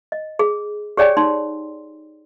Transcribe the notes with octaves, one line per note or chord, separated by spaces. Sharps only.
D#5
G#4
G4 G#4 C#5 D5 G5 G#5
D#4 C6